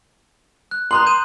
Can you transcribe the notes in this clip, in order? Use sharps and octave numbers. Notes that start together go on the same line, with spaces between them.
F#6
A#5 C6 D#6 F#6 F#7
G6 D#7 E7